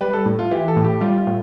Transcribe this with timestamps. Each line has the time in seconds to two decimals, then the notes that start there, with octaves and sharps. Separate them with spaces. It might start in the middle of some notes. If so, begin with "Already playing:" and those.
0.01 G3 B4
0.13 A4
0.26 A2
0.39 F4
0.51 E3 G4
0.68 A4
0.76 A2
0.84 G4
1.01 G3 F4
1.18 F4
1.27 A2